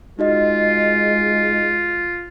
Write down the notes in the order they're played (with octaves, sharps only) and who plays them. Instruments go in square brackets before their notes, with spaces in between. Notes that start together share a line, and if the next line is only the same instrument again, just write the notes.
[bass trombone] G#3 [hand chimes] D#4 F#4 D#5 [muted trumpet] F4